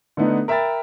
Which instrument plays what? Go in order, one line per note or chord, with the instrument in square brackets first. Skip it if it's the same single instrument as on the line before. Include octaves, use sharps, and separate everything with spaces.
[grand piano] D3 A3 B3 D#4
A#4 E5 G5 B5 A6